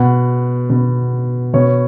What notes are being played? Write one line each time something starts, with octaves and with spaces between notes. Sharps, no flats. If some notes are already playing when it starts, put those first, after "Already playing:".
Already playing: B2 F#5
B2
B2 C#5